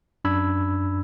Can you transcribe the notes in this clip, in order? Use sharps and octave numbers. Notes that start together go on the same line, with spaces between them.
F#2 D4 B5 E6 G#6